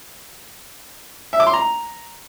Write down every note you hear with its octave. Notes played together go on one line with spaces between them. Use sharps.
E5
D6
C6
A#5